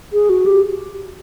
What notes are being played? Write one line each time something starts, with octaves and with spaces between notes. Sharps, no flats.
G#4
F#4
G4